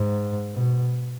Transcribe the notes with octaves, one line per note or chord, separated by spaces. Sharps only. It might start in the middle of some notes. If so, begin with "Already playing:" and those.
Already playing: G#2
B2